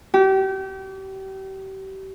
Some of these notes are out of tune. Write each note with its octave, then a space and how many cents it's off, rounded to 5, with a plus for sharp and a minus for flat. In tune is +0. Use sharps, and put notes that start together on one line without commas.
G4 -35